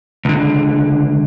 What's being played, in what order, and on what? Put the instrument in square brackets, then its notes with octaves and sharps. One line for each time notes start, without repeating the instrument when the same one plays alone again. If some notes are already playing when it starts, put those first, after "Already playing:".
[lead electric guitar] C#2 D3